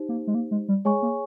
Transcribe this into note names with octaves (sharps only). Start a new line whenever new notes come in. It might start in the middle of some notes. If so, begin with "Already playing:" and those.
Already playing: D#4 G4 C5
A#3
G#3
A#3
G#3
G3
G#3 G#4 C#5 G#5 C#6
A#3